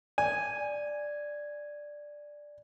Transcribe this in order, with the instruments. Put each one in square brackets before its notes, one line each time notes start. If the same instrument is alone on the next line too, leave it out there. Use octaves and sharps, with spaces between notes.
[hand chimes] D5 [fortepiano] G#5